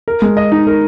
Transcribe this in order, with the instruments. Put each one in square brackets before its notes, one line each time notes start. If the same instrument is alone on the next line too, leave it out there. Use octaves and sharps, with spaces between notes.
[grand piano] A#4
G#3
D#5
D#4
A#4